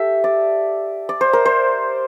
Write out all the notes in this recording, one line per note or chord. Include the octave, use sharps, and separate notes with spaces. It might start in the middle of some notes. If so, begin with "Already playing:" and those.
Already playing: G4 A4 E5
D5
D5
C5
A#4
C5